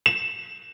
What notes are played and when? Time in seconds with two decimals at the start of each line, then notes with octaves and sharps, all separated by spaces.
0.06 E7